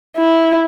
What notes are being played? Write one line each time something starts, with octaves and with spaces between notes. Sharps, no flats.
E4